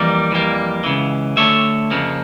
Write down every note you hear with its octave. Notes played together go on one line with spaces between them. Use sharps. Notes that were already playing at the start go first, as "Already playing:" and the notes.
Already playing: F2 E3 G3 A#3 A#4 D5
F2 E3 G3 A#3
C#2 C#3 E3
D2 D3 A3 C#5 E5
F2 C#3 F3 A#3